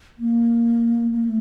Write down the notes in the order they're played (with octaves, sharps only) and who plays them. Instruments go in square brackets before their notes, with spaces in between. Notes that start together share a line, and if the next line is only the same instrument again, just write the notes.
[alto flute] A#3
A#3
A3